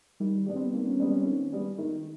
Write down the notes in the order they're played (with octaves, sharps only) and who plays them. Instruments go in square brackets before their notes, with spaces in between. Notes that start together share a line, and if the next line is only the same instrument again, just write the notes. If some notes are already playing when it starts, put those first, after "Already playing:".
[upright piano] D#3 [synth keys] G3
[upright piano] G3 B3 D4
[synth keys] C4
B3
[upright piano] D#3 [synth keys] A#3
[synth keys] C#4
[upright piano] G3 B3 D4 [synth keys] C4
[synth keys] C#4
[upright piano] D#3
G3 B3 D4
D#3